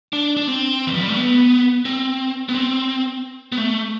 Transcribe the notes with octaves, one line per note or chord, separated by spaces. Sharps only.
D4
D4
C4
E3
F3
G3
A3
B3
C4
B3
C4
B3
A3